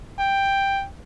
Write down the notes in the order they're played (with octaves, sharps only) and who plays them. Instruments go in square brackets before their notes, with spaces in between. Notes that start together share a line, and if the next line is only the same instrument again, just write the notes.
[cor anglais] G5